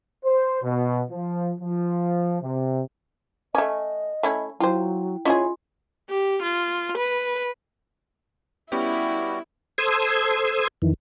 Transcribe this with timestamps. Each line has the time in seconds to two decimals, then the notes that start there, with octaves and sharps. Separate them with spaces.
0.25 C5
0.63 B2
1.10 F3
1.60 F3
2.42 C3
3.55 A3 C#4 D#5
4.23 A3 C#4 E4
4.60 F#3 E4 F4 C5 G5
5.25 C#4 E4 F4 G#4 C#5 D#5 C6
6.09 G4
6.42 F4
6.97 B4
8.72 G3 B3 C#4 E4 F#4 G4
9.78 A4 C5 C6 D#6 E6 G#6
10.82 F2 D#3 E3